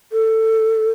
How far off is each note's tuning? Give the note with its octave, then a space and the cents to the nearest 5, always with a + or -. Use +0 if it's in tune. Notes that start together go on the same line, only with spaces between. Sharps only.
A4 +15